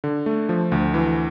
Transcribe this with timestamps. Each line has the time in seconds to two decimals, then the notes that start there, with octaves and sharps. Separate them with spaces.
0.04 D3
0.26 A3
0.49 F3
0.72 D2
0.94 E3